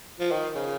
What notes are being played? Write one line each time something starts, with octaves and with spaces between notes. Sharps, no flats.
F3
D#3
C#3